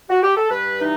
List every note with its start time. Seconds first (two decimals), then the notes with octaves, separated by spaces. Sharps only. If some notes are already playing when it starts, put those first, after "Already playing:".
0.10 F#4
0.23 G4
0.36 A4
0.50 G2 B4
0.81 E3 D#4